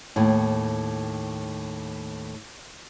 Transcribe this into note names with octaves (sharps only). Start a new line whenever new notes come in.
D#2 A2